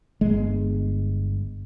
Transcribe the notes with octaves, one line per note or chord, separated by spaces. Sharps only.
G1 G#3